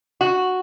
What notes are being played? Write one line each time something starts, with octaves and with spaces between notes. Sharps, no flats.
F#4